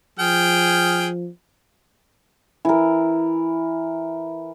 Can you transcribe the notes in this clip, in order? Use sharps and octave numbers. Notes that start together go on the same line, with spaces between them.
F3 G#4 G5 F6
E3 A#4